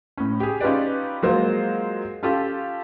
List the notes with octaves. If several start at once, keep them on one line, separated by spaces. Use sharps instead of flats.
A2 C#4
G4 G#4
C#4 D#4 F4 G4 B4 D5
F#3 G#3 A#3 F4 C5
C#4 F4 G4 A4